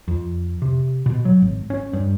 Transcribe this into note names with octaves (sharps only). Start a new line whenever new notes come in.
F2
C3
B2
F#3
G#1
C#4
G2